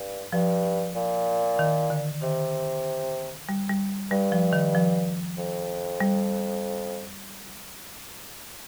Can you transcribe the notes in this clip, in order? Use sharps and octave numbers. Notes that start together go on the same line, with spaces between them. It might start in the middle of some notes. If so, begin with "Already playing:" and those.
Already playing: G2
G2 F3
A#2
D#3
D3
C3 D#3
G3
G3
G2 G3
F3
D#3
F3
F2
G3